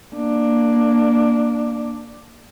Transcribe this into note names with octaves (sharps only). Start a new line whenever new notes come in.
A#3 D4